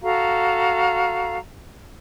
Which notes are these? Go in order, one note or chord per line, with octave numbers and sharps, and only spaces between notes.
F#4 A4 F5 A#5